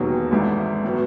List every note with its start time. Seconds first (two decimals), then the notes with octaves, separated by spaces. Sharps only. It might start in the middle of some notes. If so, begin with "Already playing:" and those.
Already playing: E1 D#2 D#3 F#3 B3
0.31 G#1 G#2 E3 A3 E4
0.84 A2 F#3 B3